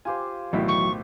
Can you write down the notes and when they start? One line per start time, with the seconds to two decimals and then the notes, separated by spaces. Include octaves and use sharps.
0.05 F4 G4 C5 G#5
0.53 B1 E2 A2 D#3 F#3 E4
0.68 C#6